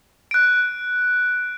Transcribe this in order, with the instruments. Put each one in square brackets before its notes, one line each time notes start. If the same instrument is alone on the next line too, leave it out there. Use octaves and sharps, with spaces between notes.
[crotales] F#6 D7